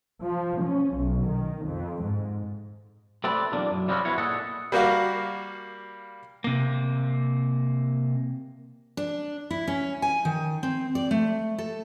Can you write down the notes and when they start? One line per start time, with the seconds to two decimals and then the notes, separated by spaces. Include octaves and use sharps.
0.24 F3
0.63 C#4
0.96 B1
1.29 D#3
1.66 F2
2.04 G#2
3.24 A3 C4 G4 B4 D5
3.52 B1 E2 A#3 D4
3.71 F#2
3.88 F3 G3 G#3 C4 C#4 F#4
4.05 B3 E4 F#4 C#5
4.18 A#2 G#4 A4 D#5 F#5
4.72 G3 A#3 F#4 F5
6.44 C3 A#3
8.97 D4
9.51 E4
9.68 C#4
10.02 G#5
10.25 D#3
10.63 C4
10.95 D5
11.11 A3
11.58 A4